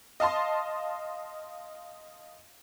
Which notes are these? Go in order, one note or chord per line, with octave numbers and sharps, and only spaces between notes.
D#5 F5 A5 C6